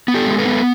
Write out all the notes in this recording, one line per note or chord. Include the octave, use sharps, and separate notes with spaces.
B3
G4 A4
G#3
A4 B4
B3